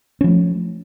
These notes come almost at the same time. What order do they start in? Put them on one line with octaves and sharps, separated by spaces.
C#4 F3 A3